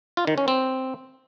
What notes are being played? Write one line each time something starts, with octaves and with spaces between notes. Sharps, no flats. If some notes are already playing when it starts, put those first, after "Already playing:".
F4
D#3
C#4
C4